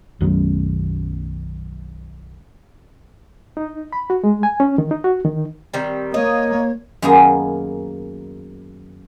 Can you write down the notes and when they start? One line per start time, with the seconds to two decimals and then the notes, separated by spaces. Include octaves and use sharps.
0.21 B1 F#2 D#3
3.57 D#4
3.93 B5
4.10 F#4
4.24 G#3
4.43 G#5
4.60 C#4
4.78 D#3
4.91 D#4
5.04 F#4
5.25 D#3
5.73 D#3 G3 C4
6.14 A#3 C#5 D#5
7.02 F#2 D#3 A#3 B3 G#4